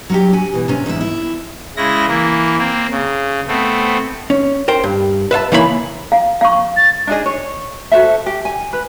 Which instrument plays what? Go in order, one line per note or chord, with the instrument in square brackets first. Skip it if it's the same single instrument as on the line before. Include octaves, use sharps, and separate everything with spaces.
[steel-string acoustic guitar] F#3 C#4 G4
F#4 G#5
B2 E3
C3 C#4
E2 G#2 E4 E5
E4
[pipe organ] C#3 G#3 E4 A#6
E3 A#3
A#3 C4
C#3
A3 B3 C4
[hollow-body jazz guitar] C#4
A#4 C5 G5
G2
B4 E5 F5 A5
C#3 E3 A#3 E4 C5 B5
[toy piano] F5
F5 C#6
[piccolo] A6
[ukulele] D4 D#4 G#4 D#5
C#5
F#4 A4 C5 E5
G4
G#5
B4